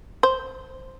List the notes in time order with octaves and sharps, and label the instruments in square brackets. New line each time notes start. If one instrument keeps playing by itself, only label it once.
[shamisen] C5